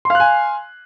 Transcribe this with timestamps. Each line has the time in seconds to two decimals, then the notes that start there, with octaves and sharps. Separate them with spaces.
0.05 C6
0.10 F5
0.15 F#6
0.20 G#5